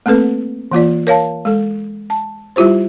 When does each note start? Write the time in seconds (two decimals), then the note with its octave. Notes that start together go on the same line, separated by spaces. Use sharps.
0.06 A3 A#3 C4 A4 B4
0.72 E3 A#3 F4 D5
1.07 A#4 C#5 F5 A5
1.45 G#3 A4
2.10 A5
2.56 G3 E4 F4 G4 C5